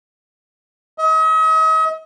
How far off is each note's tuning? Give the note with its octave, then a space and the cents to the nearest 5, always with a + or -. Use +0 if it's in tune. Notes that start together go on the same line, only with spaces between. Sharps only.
D#5 +40